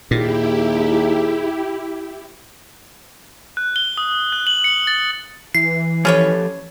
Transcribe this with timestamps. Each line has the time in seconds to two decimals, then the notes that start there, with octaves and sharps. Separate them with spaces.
0.11 D#2 A#2 E4 G4 G#4
3.57 F#6
3.76 G7
3.98 D#6
4.32 F#6
4.47 F#7
4.64 C#7
4.87 A6
5.55 E3 C7
6.05 F3 C#4 G4 A4 B4 C#5